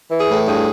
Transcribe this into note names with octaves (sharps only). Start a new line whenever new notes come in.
E3
G#4
A2
G2 G#4